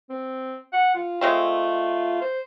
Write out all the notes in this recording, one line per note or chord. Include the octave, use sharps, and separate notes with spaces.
C4
F#5
F4
G#3 A3 C4 F4
C5